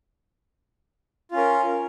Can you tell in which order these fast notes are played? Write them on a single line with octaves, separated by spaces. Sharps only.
F4 C#4 A#4